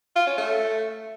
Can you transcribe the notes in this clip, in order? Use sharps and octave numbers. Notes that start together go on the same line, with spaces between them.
F4
C#4
A3